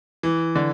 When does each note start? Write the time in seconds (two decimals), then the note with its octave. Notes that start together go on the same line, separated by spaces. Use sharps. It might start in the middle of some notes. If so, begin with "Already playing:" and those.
0.23 E3
0.55 D3